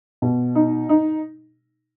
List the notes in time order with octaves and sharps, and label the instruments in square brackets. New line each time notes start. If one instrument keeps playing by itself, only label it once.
[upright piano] B2
D#4
D#4